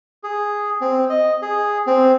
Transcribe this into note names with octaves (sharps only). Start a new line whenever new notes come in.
G#4
C4
D#5
G#4
C4